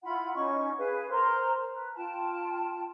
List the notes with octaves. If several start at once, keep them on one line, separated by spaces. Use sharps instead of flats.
E4 F4 F#5 B5
C#4 D#4 C#6
G#4 B4 F5 G#5
A#4 C5 A#5 C6
B4
F4 G5 A5